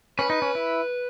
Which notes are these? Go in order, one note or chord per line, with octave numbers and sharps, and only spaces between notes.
C#4 B4
D#4
C#4
E4